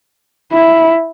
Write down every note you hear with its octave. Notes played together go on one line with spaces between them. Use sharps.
E4